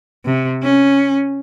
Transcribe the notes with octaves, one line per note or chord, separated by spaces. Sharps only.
C3
C#4